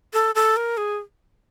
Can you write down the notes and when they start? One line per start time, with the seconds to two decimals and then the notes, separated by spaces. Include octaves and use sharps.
0.13 A4
0.35 A4
0.57 A#4
0.77 G#4